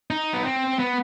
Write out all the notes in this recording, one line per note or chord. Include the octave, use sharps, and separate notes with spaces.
D#4
B3
C4
B3